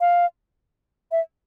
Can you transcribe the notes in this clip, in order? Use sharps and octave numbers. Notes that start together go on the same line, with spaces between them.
F5
E5